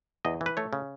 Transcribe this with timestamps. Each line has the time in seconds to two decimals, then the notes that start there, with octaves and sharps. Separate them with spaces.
0.25 E2 D#5
0.41 E3
0.46 B4
0.57 A3 C#5
0.73 C#3